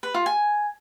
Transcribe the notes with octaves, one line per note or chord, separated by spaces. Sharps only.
B4
F4
G#5